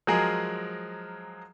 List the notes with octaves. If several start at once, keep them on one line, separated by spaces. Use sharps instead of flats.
F3 F#3 G#3 G#4 A#4